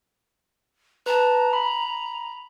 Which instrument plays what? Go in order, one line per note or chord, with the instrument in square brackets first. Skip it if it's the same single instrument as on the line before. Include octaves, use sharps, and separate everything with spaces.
[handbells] B4 A5 [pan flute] A#5
[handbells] B5